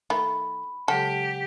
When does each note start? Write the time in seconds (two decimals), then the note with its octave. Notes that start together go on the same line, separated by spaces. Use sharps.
0.10 D#3 A3 B5
0.88 C#3 F#3 G#3 G4 A4 F#5